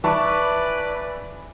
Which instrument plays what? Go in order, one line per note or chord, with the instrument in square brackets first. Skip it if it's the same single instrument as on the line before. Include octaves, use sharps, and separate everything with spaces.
[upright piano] E3 A5 C#6 [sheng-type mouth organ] B4 D5